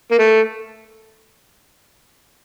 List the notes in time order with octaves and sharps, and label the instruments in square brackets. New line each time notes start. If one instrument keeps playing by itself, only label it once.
[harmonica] A#3
A3